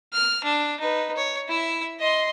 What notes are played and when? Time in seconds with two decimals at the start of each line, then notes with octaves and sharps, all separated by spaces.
0.13 F6
0.44 D4
0.80 D#4 B4
1.17 C#5
1.48 E4 E5
1.99 D#5 C6